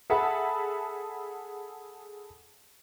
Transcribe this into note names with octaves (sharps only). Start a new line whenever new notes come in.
G#4 A4 E5 F#5 A5 B5